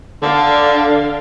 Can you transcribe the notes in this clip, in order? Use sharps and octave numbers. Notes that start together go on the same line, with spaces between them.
D3 D4 A4 F5